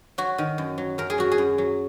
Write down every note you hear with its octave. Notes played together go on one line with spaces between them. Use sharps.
F#3 F#4
D#3
F#2
F#3
F#2 A#4
G#4
F#3 F#4
G#4
F#2
F#3